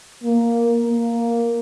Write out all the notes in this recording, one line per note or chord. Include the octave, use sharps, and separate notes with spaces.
A#3
A#3